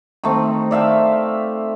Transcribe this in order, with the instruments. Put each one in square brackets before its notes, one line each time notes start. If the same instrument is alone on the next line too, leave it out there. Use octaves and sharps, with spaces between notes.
[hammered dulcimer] D#3 A3 C4
D5 E5 F5 G5